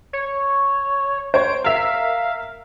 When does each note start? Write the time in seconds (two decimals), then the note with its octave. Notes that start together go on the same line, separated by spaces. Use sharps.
0.13 C#5
1.34 C5 C#5 D7
1.64 A#4 E5 F5